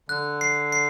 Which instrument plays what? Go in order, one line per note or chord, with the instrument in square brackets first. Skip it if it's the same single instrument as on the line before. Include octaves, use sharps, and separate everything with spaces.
[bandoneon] D3 [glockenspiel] F#6
[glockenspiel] C7
C7